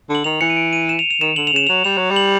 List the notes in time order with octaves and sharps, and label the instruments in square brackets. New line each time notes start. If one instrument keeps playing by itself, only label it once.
[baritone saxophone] D3
[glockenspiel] F#7
[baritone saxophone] D#3 [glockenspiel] F7
[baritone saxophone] E3 [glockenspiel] C#7
[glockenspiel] D#7
D7
D#7
E7
F7
F7
[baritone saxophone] D#3 [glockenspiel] E7
[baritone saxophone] D3 [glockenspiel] F#7
[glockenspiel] F7
[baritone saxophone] C#3 [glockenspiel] E7
[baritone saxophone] F#3 [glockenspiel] F7
[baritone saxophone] G3 [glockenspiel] F7
[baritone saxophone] F#3
G3
[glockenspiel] F#7